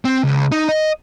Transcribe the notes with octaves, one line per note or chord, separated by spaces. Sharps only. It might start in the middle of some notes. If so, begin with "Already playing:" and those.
C4
C#2
D#4
D#5